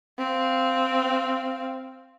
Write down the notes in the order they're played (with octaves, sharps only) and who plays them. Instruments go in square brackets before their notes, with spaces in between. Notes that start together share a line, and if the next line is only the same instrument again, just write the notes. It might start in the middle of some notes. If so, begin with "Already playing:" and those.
[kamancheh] C4 F5